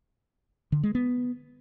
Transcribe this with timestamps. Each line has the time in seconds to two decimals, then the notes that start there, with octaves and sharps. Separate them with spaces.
0.72 D3
0.83 G#3
0.95 B3